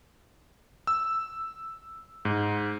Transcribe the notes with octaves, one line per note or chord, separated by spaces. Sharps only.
E6
G#2